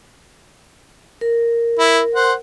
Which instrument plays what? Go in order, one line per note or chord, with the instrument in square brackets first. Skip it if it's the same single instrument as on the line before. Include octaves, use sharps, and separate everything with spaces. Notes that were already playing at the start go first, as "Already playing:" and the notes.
[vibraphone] A#4
[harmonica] E4 [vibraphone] A#4
[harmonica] C5 F#5